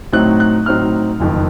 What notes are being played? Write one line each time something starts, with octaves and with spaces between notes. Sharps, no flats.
A2 F#3 C4 D#4 F#6
F#6
A2 F#3 C4 D#4 F6
F#1 F2 D#3